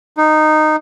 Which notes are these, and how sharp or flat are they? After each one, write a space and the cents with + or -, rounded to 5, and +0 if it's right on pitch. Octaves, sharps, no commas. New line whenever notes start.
D#4 -15